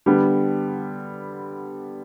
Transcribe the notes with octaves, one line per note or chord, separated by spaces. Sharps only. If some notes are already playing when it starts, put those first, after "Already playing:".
D3 G3 B3